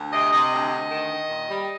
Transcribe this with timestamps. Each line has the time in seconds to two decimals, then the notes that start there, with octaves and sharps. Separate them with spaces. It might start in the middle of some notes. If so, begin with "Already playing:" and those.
Already playing: D2
0.13 C3 D#5
0.32 C3 D#5
0.52 D2 D#5
0.71 D2
0.90 D#3
1.10 D#3
1.29 A#2
1.49 G3